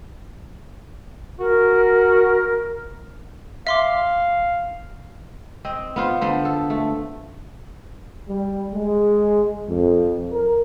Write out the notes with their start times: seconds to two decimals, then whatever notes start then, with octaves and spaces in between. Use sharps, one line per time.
1.40 F#4 A#4
3.67 E5 F5 C6 D6
5.65 C4 D#5
5.96 B3 F4 C5
6.21 D3 B3 C5
6.45 A4
6.70 A3
8.29 G3
8.74 G#3
9.69 F2
10.31 A#4